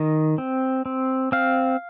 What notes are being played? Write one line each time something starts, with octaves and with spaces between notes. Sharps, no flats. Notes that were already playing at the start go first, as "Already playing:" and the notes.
Already playing: D#3 D#5
C4
C4
C4 F5